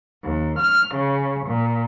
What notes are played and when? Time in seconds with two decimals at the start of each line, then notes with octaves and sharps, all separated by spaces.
0.23 D#2
0.59 F6
0.94 C#3
1.47 A#2